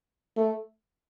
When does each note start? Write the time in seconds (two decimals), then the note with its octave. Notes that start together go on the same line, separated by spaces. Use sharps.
0.37 A3